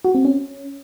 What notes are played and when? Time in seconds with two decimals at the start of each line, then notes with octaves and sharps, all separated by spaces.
0.05 F#4
0.15 C4
0.25 C#4